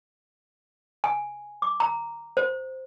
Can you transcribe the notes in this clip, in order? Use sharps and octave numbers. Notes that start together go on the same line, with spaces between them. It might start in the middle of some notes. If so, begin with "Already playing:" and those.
G#5
D6
A#5
C5